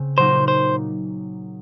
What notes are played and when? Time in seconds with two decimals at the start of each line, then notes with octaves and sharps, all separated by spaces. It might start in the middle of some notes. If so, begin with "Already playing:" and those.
Already playing: C#3 C4
0.18 A#2 F#3 A#3 D#4 C5
0.48 C5